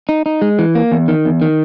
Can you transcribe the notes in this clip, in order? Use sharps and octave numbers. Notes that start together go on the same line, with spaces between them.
D#4
D#4
G#3
E3
A#3
E2
D#3
E2
D#3